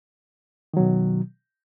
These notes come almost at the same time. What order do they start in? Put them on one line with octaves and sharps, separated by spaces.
D#3 F#3 B2